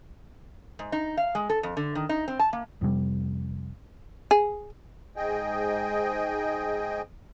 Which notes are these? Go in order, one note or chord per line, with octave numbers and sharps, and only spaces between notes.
G#2
D#4
F5
G#3
A4
F2
D3
D#3
D#4
C4
A5
A#3
F2 C3 G3
G#4
G#2 G#4 D#5 G5